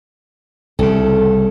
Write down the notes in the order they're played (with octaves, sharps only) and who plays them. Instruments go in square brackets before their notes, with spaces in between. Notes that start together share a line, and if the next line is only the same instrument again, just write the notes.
[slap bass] C2 C#3 [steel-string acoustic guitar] A4